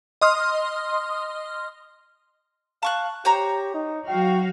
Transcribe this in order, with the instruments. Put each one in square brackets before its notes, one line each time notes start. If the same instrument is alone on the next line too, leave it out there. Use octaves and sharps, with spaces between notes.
[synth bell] D#5 C6 D#6 F6
[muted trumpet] F5 [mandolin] A5 C#6 F#6
[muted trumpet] G4 [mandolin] C5 C#5 A#5
[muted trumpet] D#4
[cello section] F#3 F#4 F5 [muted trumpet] G5